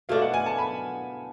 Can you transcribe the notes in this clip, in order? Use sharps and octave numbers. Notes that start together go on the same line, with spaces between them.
B2 A3 D4 F5
F#5
G#5
A5
B5